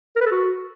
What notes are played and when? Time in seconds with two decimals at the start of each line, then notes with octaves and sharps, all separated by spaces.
0.16 A#4
0.21 B4
0.26 A4
0.31 F#4